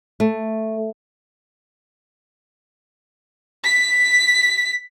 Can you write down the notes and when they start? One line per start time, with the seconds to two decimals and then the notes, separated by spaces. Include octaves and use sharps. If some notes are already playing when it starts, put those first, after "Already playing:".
0.20 A3
3.65 B6